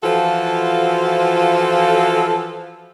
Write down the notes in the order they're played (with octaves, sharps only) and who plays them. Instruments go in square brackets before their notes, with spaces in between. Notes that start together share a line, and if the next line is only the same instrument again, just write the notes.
[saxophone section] E3 F3 F4 F#4 A4